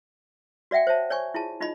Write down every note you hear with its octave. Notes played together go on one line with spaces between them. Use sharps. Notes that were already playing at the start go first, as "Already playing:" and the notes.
F#4 D5 E5 F#5 G5
C5 C#5 E5 A5
C#5 D5 G#5 C#6
E4 F4 G#4 A5
D#4 F4 D#5 B5